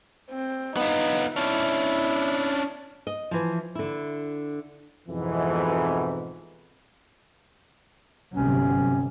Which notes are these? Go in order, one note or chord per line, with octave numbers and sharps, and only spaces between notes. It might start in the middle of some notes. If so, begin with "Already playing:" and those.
C4
B3 D#4 F4
C#4 D4 E4
D#5
E3 F3
D3 E4
F2 G#2 B2 E3
G1 C3 F#3 C#4